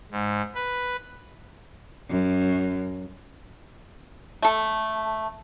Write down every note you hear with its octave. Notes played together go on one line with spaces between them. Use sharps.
G#2
B4
F#2
A3 A4